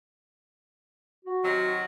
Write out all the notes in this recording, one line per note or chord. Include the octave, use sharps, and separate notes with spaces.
F#4
C3 D#3 F#3